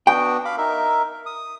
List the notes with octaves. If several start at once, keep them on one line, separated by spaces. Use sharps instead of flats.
B3 D4 F#4 G5
F5 B5 D6
D#4 A#4 E5
D#6